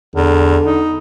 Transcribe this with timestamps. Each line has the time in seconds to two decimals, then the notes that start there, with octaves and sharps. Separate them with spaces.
0.15 E2 D3
0.65 D#4